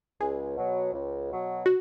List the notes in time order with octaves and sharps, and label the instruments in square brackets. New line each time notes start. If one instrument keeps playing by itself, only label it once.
[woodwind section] C#2 [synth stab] G#4
[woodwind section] B2 F#3
C#2
B2 F#3
[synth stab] F#4